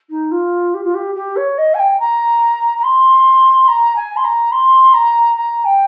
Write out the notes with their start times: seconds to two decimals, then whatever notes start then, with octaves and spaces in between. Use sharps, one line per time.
0.10 D#4
0.31 F4
0.74 G4
0.84 F4
0.95 G4
1.15 G4
1.37 C#5
1.58 D#5
1.74 G#5
1.79 G5
2.00 A#5
2.78 A#5
2.84 C6
3.68 A#5
3.96 G#5
4.17 C6
4.25 A#5
4.52 C6
4.94 A#5
5.36 A#5
5.65 G5